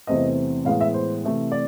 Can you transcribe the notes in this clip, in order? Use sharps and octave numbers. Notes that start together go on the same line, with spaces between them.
E2 C3 E3 A3 C4 D#5
A2 E3 G#3 B3 F5
E5
C5
C3 E3 A3 C4
D5